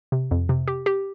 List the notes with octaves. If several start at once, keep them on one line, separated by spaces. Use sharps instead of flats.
C3
F2
C3
G4
G4